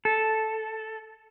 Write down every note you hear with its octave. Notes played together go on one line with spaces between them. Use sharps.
A4